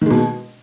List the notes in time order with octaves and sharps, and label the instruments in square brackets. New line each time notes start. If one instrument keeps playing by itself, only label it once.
[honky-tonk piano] D#3
G#3
B2